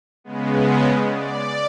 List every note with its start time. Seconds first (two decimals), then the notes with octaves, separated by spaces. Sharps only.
0.24 C#3 G#3 B3
1.12 D5